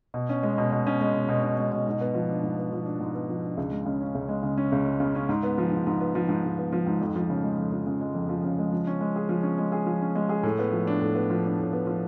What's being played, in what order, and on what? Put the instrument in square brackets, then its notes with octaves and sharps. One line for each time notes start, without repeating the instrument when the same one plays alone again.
[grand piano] B2
C#4
G#3
B2
B2
C#4
G#3
B2
B2
C#4
G#3
B2
G#2
B3
F3
D4
G#2
B3
F3
D4
G#2
B3
F3
D4
C#2
G#3
C#3
C#4
C#2
G#3
C#3
C#4
C#2
G#3
C#3
C#4
G#2
B3
F3
G#2
G#2
B3
F3
G#2
G#2
B3
F3
G#2
F2
F3
C#3
G#3
F2
F3
C#3
G#3
F2
F3
C#3
G#3
F3
C#4
G#3
G#4
F3
C#4
G#3
G#4
F3
C#4
G#3
G#4
A2
B3
F3
D4
A2
B3
F3
D4
A2
B3
F3